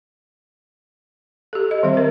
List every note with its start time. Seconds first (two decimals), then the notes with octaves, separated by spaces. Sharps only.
1.53 G4 A4
1.71 D#5
1.83 D#3 G3 C4 E5
1.97 A#4